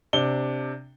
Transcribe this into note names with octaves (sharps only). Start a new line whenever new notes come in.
C3 D4 G7